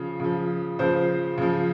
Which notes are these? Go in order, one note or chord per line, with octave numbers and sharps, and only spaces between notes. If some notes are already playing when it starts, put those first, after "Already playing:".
Already playing: C#3 F3
C#3 F3
C#3 F3 C5
C#3 F3